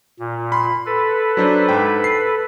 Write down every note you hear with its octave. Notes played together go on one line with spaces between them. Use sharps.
A#2
B5 C6
A4 B4
F#3 D4 C5
G#2 G5
C7